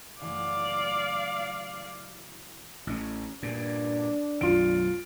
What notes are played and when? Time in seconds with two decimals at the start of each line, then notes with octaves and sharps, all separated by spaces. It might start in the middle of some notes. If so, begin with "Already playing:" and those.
0.21 F#1 E3 A3 D5 F5
2.87 A1 C#4
3.43 G2 A#2 D4
4.41 B1 F#2 D#3 F4 D7